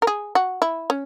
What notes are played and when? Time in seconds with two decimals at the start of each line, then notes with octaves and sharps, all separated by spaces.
0.02 A#4
0.07 G#4
0.35 F#4
0.62 E4
0.90 C#4